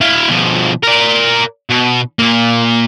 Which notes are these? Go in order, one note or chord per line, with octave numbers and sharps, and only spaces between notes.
E4 F5
B2 F3
A#4 D5
B2
A#2 A#3